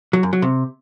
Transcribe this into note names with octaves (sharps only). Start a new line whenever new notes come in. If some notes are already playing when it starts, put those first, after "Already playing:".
F#3
F#2
F#3
C3